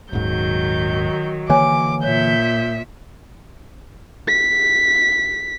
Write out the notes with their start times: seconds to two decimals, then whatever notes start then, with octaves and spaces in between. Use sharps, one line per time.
0.13 D#1 G#2 D#3 F#3 G6
1.50 D3 E3 A#3 C#5 G#5 D6
2.03 A#2 C#5 E5 G6
4.28 B6